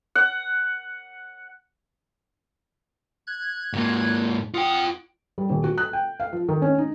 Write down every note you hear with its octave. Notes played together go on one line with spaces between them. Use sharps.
F#5
F#6 G#6
G#2 A#3
F4 F#5 G5 D#6
G3
D#1
F#4
F#6
G5
F5
F3
D#3
C#4
D#4